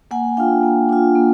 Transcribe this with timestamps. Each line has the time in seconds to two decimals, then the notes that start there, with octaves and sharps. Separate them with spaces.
0.11 A#3 F#5 G#5
0.37 D4 F4 F5 G5
0.63 A#3
0.89 D4 F4
1.15 A#3